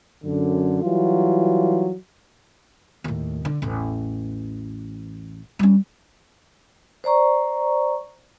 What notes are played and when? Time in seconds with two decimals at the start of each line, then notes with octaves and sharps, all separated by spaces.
0.24 F#2 D3
0.84 E3 F#3 G3 F4
3.04 D#2 A2
3.45 D3
3.62 A1 E2
5.59 G3 C#4
7.04 C5 D5 A#5 C#6